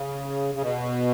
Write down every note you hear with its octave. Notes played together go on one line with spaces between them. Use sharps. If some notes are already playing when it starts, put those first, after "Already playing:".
Already playing: C#3
C#3
B2